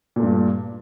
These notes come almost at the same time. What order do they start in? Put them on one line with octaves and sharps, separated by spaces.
A#2 A3 G2